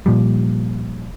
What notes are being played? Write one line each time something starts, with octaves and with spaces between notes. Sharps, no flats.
A#2 F3 G3